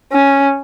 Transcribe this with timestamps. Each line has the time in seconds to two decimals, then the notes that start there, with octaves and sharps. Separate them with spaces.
0.12 C#4